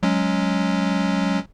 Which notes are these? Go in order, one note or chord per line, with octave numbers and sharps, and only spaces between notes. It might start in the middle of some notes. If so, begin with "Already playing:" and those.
F#3 G#3 C#4